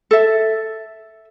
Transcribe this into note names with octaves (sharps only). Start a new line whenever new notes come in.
A4 E5